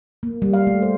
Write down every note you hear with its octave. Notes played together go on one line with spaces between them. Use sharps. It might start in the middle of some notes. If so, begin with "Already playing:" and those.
A#3
G3
F5
A3
C5